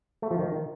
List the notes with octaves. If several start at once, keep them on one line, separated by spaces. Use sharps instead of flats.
A3
F3
D#3